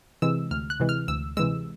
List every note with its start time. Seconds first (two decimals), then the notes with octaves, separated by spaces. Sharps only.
0.22 C3 E3 G#3 E6
0.51 D2 F6
0.70 F#6
0.80 C3 E3 G#3
0.89 F6
1.08 D2 E6
1.37 C3 E3 G#3 E6